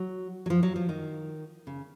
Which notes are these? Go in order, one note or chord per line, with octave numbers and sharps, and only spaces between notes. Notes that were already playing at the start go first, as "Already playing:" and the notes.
Already playing: F#3
F#3
F3
F#3
F3
D#3
C#3